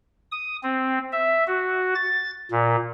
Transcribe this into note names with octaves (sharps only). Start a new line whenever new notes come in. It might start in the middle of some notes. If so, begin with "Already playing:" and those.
D#6
C4
E5
F#4
A6
A#2